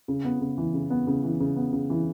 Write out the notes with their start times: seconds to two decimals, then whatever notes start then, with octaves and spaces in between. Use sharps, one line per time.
0.08 C#3
0.24 B3
0.41 C#3
0.58 E3
0.74 C#3
0.90 B3
1.07 C#3
1.24 E3
1.40 C#3
1.56 B3
1.73 C#3
1.90 E3